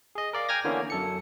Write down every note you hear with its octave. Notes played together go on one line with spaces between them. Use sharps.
G#4 D#5
A#4 D5 F5
G5 G#5 F6 G#6 A#6
D3 E3 A#3 B3 C#4
F#2 A4 C#7